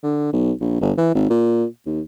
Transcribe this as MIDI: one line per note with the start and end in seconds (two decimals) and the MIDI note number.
0.03 0.31 50
0.33 0.52 35
0.60 0.78 34
0.81 0.92 31
0.97 1.11 52
1.15 1.30 32
1.30 1.65 46
1.86 2.01 39